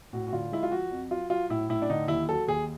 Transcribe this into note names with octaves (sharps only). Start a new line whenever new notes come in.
A2 F#4
F#4
D3 F4
G#3 E4
F4
F3 F#4
F2
F#3 F4
F#3 F4
A2 E4
A2 E4
D4
D3 D#4
D#2 E4
F#3 A4
D#2 G#4